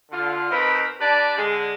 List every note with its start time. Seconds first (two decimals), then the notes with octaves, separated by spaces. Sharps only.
0.11 D3 F4
0.50 B2 C4 D#4 A#4 B4 B5
1.00 D4 G4 B4 D5 A5
1.38 D3 G#3 G#4